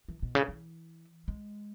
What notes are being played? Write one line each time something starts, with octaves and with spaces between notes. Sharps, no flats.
E3
B2
C#3
E3
G#3